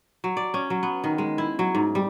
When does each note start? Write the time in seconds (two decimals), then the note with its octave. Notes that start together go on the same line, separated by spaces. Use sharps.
0.24 F#3
0.37 D5
0.54 C#4
0.70 F#3
0.83 B3
1.04 D#3
1.18 G#3
1.38 E4
1.59 F#3
1.75 G#2
1.95 G3